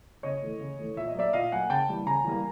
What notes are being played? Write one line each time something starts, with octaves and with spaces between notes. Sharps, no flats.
C#3 C#5 D#5
E3 A3
C#3
E3 A3
A#2 E5
D#5
F#3 A#3 D5 E5
A#2 D#5 F5
F#3 A#3 F#5 G#5
C#3 G5 A5
E3 G3 A#3
C#3 G#5 A#5
E3 G3 A#3